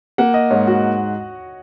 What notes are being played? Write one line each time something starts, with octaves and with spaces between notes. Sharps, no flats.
A#3 F#5
D#5
G#2 C#5
F#4